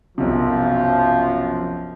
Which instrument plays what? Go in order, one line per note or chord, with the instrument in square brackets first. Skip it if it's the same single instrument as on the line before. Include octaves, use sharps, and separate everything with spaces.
[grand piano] B1 C3 [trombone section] F#2 F3